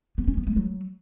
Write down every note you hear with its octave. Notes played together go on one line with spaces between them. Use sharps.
B3
C#4
B3
G#3
F#3